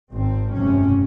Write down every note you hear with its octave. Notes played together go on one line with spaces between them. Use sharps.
G#1 C4
F1 G2 C3 C#4